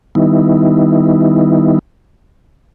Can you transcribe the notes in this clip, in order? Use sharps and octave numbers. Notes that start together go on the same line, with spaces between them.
D#3 G3 B3 D#4 E4